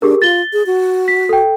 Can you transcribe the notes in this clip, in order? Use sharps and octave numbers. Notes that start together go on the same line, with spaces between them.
D4 G4 G#4 A#4
F4 A6 G7
G#4
F#4
B6
A4 G5